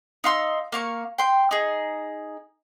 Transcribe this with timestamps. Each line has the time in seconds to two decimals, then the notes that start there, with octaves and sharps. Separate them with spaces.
0.24 D#4 F5 C6 E6
0.72 A#3 F5 C#6
1.18 G5 C6
1.51 D#4 G#4